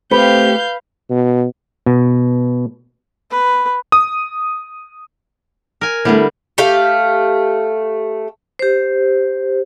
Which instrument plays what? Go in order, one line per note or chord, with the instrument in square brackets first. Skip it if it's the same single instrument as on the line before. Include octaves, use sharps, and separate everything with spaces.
[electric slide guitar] A3 G4 [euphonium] C4 [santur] B4 [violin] F5 G6
[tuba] B2
[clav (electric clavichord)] B2
[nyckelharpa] B4
[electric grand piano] D#6
[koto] A#4 G#5
[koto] D3 G3 [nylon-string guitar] A3 B3 E4
[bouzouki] A3 G4 F5
[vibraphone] G4 C5